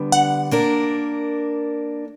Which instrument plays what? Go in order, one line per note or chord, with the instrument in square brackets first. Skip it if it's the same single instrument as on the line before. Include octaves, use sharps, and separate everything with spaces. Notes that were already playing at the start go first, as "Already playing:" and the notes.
Already playing: [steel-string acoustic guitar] D3 G3 B3 D4
[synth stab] F#5
[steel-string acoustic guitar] A#3 D4 A#4